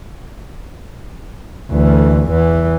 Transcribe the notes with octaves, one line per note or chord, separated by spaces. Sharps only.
D2 E3
E2 E3